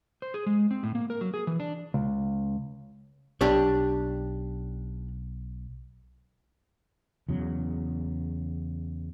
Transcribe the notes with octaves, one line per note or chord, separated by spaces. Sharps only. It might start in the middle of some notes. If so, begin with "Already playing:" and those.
C5
G#4
G#3
C4
A2
A#3
A#4
F#3
G#4
E3
D4
C#2
B1 D4 G4 C#5
E2 C#3 F#3